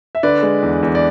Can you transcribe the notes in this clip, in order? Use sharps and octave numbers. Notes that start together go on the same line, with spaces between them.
E5
D3 B4 D5
G#3
E2
E2
D5